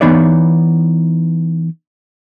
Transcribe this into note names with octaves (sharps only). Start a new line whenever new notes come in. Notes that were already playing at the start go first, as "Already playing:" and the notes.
E3 B3 D#4 C#5 D5